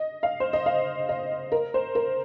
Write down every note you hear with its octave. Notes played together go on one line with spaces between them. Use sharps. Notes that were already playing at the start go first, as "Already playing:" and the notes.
Already playing: D#5
F5
C5
D#5
F5
D#5
A#4
C5
A#4